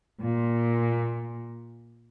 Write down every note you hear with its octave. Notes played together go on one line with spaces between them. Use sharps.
A#2